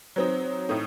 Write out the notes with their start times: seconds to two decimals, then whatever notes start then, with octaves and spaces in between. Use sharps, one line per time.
0.16 F#3 C4 D#4
0.69 A2 A3 D#4